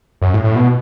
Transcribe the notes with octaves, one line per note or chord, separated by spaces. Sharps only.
F#2
A2
A2
B2